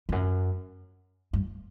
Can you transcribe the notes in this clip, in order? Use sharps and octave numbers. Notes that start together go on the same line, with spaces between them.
E2
F#2
G2